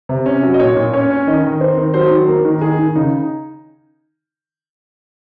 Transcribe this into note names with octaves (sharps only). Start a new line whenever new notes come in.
C3
C#4
F#3
D#5
A#2 C#5
A#2
C#4 C#5
C#4
D#3 D#5
D#3
C4
D#3
F#3 C5
D#3
A#3 A#4
D#3
D#3 G#4
D#3
C#3 D#4